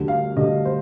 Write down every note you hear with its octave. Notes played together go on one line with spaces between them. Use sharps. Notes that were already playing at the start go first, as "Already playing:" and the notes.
Already playing: D2 D3 G3
F5
D2 D3 G3 D#5
C5